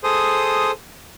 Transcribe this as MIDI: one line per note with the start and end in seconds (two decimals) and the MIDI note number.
0.04 0.71 68
0.04 0.71 69
0.04 0.71 72
0.04 0.71 87